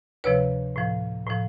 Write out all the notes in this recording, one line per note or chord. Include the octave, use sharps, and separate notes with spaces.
D2 C3 F3 B4 C#5
A2 F3
A2 F3